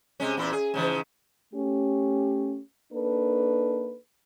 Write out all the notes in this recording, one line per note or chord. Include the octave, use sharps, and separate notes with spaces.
C3 G#3 C#4
E2 A#2 E4
G#4
G#2 C#3 E3
A3 C#4 G4
A#3 D4 D#4 A4 B4